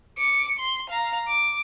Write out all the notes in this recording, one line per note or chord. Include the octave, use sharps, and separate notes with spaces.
D6 C#7
C6
F5 A#5
D6